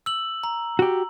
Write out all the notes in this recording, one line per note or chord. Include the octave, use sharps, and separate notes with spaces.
E6 F#7
A#5
F#4 G4